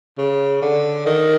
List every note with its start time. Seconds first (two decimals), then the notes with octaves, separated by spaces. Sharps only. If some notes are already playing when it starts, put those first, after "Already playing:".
0.18 C#3
0.62 D3
1.06 D#3